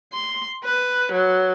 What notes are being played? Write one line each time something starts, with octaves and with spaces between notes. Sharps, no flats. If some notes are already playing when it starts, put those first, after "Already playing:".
C6
B4
F#3